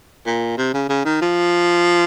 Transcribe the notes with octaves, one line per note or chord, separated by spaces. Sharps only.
A#2
C3
C#3
C#3
D#3
F3